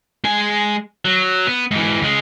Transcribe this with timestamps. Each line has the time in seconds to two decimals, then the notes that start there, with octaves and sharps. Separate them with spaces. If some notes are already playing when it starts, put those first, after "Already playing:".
0.24 G#3 G#5
1.05 F#3
1.47 B3
1.71 G#2 E3
2.01 C#2 G#3